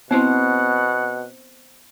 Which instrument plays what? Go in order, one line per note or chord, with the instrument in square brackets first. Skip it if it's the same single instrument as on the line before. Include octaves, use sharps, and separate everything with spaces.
[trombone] B2 [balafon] B3 E4 [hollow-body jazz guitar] C4 C5 A#5 [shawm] F#5